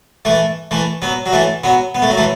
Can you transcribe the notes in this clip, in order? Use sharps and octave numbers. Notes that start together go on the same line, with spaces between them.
E3 A3
E3 A3
F#3 B3
F#3
E3 A3
F#3 B3
B3
A3
F#3
E3 A3